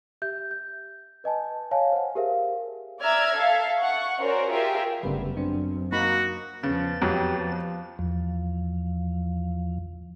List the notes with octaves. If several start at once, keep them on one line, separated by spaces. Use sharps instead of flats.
G4 E5 G6
G6
B4 D#5 G#5 A5
C#5 F5 G#5 A5
C5 F#5
G4 G#4 A#4 C5 E5 F5
D5 E5 A#5 E6 F6 G#6
A4 E5 F5
F#5 C#6
C#4 F#4 A#4 C5 D5
F4 G4 G#4 A#4 E5
G1 F#2 C#3 G3 A3 B3 B4
C4 D4 C5
A#3 D#4 F#4 B5
E2 C#3 F3 B4 A6
F2 F#3 G4
F3
E2 F3